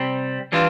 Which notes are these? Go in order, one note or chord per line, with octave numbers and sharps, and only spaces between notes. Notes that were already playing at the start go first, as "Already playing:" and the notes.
Already playing: C3 G3 C4
E3 G3 D4 F4